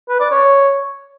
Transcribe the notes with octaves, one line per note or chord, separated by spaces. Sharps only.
B4
D5
C#5